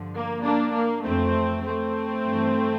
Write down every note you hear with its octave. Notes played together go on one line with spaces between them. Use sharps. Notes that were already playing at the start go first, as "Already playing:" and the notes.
Already playing: G2 D3 F3
A#3
A#3 D4
A#3
F2 E3 A3 C4
A3 C4
G2 E3